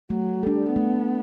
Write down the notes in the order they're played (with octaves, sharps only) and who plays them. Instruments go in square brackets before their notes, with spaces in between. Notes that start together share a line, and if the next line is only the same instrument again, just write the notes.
[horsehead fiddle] F#3 [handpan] A3
[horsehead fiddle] G3 [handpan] D4 A4
[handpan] A3 [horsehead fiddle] B3